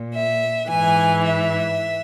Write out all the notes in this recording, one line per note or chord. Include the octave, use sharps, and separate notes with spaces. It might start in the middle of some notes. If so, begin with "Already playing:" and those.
Already playing: A#2
E5
G#2 E3 G#5
E5